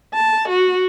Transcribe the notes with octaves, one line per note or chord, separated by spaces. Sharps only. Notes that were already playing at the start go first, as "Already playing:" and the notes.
A5
F#4